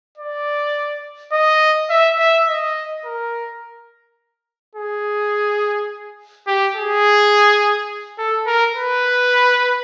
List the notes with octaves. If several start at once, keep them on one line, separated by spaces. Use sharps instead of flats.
D5
D#5
E5
E5
D#5
A#4
G#4
G4
G#4
A4
A#4
B4